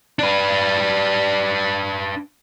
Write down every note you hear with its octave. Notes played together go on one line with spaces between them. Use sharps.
D4 B4